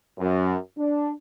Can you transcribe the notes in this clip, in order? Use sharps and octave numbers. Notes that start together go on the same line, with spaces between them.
F#2
D4